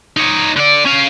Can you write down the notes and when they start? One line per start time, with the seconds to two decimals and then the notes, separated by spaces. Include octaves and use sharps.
0.17 D#4 C#5
0.56 D3 D5
0.85 C#4 F5